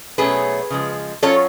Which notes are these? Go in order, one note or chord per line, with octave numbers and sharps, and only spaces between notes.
B2 F#3 A3 C#4 G#4 B4
C#3 F3 G#3
F#3 C#4 F4 A4 C#5